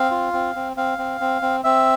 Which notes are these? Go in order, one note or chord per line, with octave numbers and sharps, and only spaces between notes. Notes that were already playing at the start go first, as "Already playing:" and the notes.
Already playing: C4 F5
F4
C4
C4
C4 F5
C4
C4
C4
C4 E5